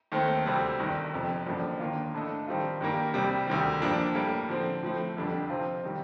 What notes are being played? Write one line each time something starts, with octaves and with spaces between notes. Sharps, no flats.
D#2 D#3 A3 C4
D2 C3 G3 C4
G1 G2 D#3
G1 F2 C3
A1 G2 D3 F3 A#3
D#2 D#3 A#3 D4 F4
A2 A3 D4 A4 D#5
D#3 G3 C4 F4 A4
G2 D#3 G3 A#3
C2 C3 G3
D2 C3 D#3 G3
G2 F3 A#3 D4
A2 G3 A#3
D3 F3 C4
A2 F3 A3 C4
F1 F2 D3 G3 D4
C3 F3 C4 F4
C3 D#3 G3